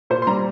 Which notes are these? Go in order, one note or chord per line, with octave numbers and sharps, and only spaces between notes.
A#2 C5
C6
G3 A#5